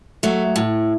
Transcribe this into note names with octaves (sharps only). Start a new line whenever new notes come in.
F#3 A3
A2